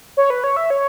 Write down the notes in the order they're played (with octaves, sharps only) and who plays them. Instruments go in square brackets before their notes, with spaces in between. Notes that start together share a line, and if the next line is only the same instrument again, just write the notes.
[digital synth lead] C#5
B4
C#5
E5
C#5